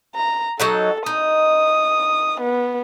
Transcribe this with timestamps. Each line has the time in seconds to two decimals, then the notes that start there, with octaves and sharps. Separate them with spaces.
0.15 A#5
0.60 F#3 D#4 A4 F#5
1.06 D#4 D#6
2.41 B3